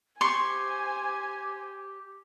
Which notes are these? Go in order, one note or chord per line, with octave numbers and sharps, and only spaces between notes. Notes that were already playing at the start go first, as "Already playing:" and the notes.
G4 C5 G#5 C6 C#6